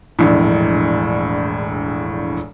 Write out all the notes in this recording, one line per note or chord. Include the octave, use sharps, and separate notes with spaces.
E1 A#1 A2